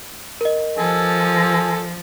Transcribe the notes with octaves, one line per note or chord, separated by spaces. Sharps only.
A#4 D#5
F3 A4 G#5